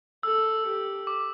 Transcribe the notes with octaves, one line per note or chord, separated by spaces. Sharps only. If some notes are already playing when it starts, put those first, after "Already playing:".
A4 E6
G4
D6